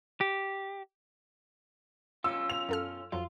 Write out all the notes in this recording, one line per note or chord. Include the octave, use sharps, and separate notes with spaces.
G4
B1 C#4 F4 E6
F7
F#2 A4 F6
F2 F#3 F4